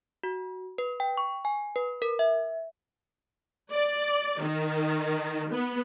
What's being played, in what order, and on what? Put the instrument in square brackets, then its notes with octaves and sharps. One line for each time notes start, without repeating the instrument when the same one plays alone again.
[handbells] F#4
B4
G5
C#6
G#5
B4
A#4
E5
[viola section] D5
D#3
B3